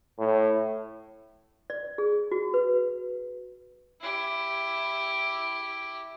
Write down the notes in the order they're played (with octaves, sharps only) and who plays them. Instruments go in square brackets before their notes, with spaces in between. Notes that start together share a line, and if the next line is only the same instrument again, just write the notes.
[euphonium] A2
[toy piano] D5
G#4
F#4
B4
[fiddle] E4 G4